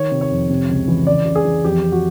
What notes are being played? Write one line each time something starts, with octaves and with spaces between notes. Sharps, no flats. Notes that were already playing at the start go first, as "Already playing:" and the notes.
Already playing: D#3 C#5
C3
C#5
F2
C3
C#2
E3
C#3 D5
C#3
G#4
E3
F2 G4
F2
F#4